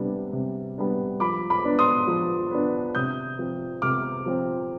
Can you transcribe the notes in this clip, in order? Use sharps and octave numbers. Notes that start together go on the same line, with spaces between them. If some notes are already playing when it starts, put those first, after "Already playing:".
Already playing: C3 G3 B3 D4
C3
G3 B3 D4
F3 B5 D6
B5 D6
B3 D4
C6 D#6
F3
B3 D4
C3 D#6 G6
F3 C4
C3 D6 F6
F3 C4